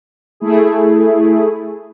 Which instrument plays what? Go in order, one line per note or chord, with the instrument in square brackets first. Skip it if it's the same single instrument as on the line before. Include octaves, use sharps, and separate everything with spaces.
[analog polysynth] A3 E4 G#4